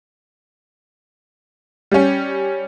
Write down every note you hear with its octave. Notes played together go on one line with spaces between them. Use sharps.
G3 C#4